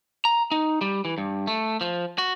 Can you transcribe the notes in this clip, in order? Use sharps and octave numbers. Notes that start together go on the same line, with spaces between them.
A#5
D#4
G3
E3
G2
A3
F3
F#4